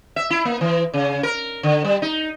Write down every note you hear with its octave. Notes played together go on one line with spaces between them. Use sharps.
E5
E4
A#3
E3
C#3
A#4
D3
G3
D#4